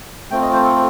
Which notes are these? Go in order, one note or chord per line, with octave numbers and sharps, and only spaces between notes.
A3 C4 F4 G5
D#5
C5
A4